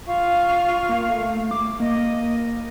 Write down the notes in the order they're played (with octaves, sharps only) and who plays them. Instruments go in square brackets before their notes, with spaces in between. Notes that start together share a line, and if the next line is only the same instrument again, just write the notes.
[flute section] F4 F5 C#6
[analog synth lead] A#3
A3
D6
[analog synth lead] A#3 [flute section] D#5